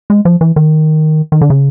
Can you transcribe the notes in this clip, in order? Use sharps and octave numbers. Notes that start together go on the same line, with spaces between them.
G#3
F3
E3
D#3
D#3
D3
C#3